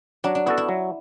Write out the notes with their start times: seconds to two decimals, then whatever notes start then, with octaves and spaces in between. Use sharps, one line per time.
0.24 F#3 D4
0.35 D4
0.46 B3 E4 F#4 A4
0.58 E4
0.69 F#3